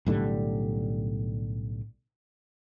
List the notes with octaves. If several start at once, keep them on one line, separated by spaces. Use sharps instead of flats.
B1 A2 D3 G3